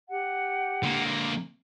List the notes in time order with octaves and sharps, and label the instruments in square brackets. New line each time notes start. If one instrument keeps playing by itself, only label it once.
[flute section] G4 F#5
[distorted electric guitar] D3 A#3